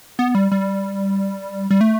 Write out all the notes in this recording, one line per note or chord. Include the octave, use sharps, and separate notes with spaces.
B3
G3
G3
G3
A3